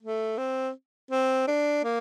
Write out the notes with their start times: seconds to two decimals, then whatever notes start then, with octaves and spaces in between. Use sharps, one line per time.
0.02 A3
0.38 C4
1.11 C4
1.48 D4
1.84 A#3